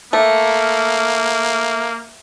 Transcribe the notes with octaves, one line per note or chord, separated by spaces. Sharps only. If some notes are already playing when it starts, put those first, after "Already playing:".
A3 A#3